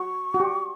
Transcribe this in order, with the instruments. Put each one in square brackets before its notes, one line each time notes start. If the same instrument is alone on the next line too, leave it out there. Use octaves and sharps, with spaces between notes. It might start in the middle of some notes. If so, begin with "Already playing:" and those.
Already playing: [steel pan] F#4 [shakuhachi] C#6
[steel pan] F#4
G4